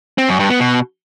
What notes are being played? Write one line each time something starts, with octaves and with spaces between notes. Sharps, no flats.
C4
F#2
G2
B3
B2